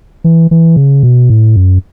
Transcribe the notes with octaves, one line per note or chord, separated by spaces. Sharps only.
E3
E3
C#3
B2
A2
F#2